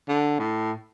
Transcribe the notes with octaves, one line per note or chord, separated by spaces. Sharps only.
D3
A2